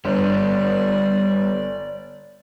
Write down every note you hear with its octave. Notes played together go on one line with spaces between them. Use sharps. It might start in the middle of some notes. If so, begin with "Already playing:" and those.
G1 G3 B3 D5